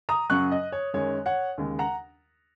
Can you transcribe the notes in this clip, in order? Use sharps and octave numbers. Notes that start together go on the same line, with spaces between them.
A#5 D#6
F#2 C#3 F#3 C#6 F#6
D#5
C#5
F#2 D#3 G#3 C#5
C#5 F#5
D#2 C#3 G#3
F#5 A#5